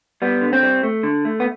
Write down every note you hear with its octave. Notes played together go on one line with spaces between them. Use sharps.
G3 B3
D3
C4
G3
A3
D3
A3
B3